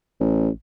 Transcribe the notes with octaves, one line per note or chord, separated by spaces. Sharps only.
A1